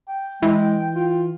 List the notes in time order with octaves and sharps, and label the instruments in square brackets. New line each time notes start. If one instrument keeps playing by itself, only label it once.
[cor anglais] G5
[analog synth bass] E3 [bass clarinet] G#3
[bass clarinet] F4